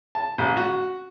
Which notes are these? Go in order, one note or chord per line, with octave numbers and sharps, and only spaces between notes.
A5
A1
F#4